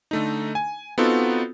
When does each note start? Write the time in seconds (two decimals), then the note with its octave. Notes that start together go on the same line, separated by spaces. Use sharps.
0.11 D3 A3 D#4
0.55 G#5
0.98 B3 C4 D#4 F4 F#4 A4